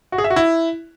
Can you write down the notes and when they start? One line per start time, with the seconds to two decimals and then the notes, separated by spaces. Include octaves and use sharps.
0.12 F#4
0.18 G#4
0.24 E5
0.30 F#4
0.36 E4